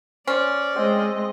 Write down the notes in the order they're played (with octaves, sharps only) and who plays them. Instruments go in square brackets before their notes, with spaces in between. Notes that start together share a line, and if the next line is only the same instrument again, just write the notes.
[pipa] C#4 [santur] C5 [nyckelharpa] D5
[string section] G#3 D#5 [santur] C4 G5